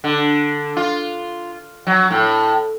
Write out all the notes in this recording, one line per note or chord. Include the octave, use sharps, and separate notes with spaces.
D3
F4
F#3
A2